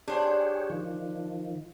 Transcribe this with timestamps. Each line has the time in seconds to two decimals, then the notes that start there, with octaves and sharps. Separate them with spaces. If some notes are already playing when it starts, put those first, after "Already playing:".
0.08 D4 G4 G#4 C5 C#5
0.70 D#3 F3